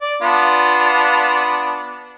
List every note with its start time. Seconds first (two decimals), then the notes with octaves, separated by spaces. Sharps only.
0.01 D5
0.22 B3 D4 F4